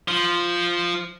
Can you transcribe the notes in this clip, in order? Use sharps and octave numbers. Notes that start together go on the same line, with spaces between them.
F3